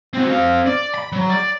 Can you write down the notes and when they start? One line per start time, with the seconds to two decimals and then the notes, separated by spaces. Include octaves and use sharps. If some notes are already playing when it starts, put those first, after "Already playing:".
0.14 C4 F#4
0.29 C4 F5
0.66 D5
0.95 B5
1.12 F#3
1.29 D5